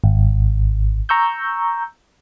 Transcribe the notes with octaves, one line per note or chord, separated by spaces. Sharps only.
G#1
A#5 C#6 E6 G6